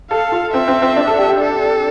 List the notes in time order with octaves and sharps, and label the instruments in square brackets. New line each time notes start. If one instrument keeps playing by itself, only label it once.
[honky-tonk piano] A4 [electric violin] F5
[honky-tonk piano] F4
[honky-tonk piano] C4 [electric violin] E5
[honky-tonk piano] C4
C4
D4
A4
G4
G4
[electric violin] A4